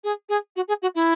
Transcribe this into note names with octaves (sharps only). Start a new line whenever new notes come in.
G#4
G#4
F#4
G#4
F#4
E4